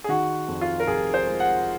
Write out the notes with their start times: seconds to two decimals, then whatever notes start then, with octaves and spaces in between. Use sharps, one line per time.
0.04 G#4
0.09 D#3 F#4
0.48 F2
0.61 F4
0.80 A#4
0.87 F1 G#4
1.14 C5
1.27 G#3
1.40 F#5